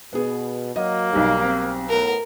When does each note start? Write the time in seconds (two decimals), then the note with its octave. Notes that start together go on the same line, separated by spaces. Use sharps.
0.13 B2 B3 G#4
0.76 F#3 A#3 D#5
1.13 B1 G3 D#4
1.42 C4
1.90 A2 B3 A#4